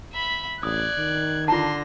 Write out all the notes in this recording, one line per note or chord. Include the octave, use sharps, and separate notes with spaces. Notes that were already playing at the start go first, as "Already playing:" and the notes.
E5 B5
A1 D5 D#6 F#6 G#6
D#3
D3 F4 A5 C6 A#6